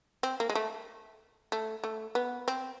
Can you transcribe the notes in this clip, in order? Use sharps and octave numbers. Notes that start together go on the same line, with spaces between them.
C4
A#3
G#3
A3
A3
A3
B3
C4